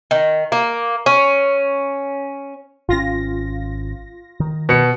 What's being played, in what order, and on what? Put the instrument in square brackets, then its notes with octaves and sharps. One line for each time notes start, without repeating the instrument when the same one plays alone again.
[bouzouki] D#3
A#3
C#4
[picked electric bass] G#1 C#4 [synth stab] F4 A#6
[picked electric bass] D#3
[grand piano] B2 C#7